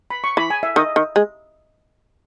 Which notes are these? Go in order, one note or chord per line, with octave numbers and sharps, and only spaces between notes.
B5
C#6
E3 B5
G#5
E5
D#3 D#5
D#3
G#3